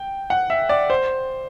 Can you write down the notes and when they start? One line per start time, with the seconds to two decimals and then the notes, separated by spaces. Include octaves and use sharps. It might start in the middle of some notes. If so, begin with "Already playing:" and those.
Already playing: G5
0.30 F#5
0.50 E5
0.69 D5
0.90 C5